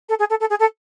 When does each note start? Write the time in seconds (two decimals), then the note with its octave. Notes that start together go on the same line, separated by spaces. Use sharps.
0.09 A4
0.19 G#4
0.30 A4
0.40 A4
0.50 G#4
0.59 A4